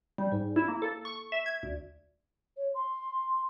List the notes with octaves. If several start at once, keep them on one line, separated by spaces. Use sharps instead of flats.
G3
G#2
E4
A#3
A4
C#6
E5
G#6
D2
C#5
C6